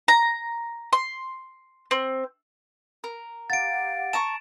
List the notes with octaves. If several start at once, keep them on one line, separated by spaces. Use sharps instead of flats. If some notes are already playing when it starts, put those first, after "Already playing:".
A#5
C6
C4
A#4
G4 F5 F#5 A6 D7
A5 A#5 C#6 E7